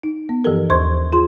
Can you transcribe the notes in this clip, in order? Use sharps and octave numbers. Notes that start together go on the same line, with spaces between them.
D#4
B3
G2 E3 F3 G4 A4 A#4
D#2 C5 C6 C#6 G#6
F4 G#4 C6